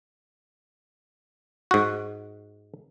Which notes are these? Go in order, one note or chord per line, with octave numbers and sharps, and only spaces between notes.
G#2 F#4